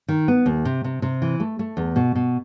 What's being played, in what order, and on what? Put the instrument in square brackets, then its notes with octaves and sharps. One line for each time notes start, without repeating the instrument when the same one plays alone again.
[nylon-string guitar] D#3
B3
D#2
C3
C3
C3
E3
A3
A3
E2
B2
B2